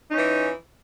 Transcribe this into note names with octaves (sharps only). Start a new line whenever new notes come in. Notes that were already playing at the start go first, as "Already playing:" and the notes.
E3 C#4 D#4